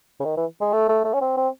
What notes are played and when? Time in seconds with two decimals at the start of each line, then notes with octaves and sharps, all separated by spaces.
0.20 C#3
0.25 D#3
0.37 E3
0.61 G#3
0.73 A3
0.89 A3
1.04 A3
1.13 C#4
1.21 C4
1.37 C4